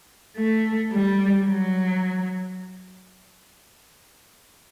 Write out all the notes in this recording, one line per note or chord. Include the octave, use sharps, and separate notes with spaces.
A3
G3
F#3